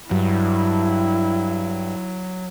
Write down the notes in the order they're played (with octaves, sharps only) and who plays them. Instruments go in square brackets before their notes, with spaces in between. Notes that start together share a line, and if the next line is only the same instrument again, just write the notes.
[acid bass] G2 [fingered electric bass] F#3 [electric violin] E4